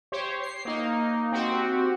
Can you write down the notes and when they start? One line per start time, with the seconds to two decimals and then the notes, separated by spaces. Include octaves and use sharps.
0.12 G4 C5 C#5
0.43 C7
0.65 A#3 D#4
1.32 C4 F#4 G4